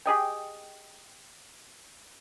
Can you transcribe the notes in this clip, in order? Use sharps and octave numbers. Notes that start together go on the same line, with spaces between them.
G4 G#4 D#5 G5